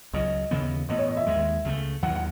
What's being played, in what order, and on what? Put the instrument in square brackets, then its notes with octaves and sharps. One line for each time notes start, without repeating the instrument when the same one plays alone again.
[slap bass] C#2 C#3 F#3 [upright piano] D#5
[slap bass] D#2 C#3 E3 B3
[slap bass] A2 E3 B3 [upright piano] D#5
[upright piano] C#5
D#5
E5
[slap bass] D#2 D#3 G#3
C#2 C#3 E3 A3
[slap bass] D#2 D#3 F#3 [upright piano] F#5
[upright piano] F#5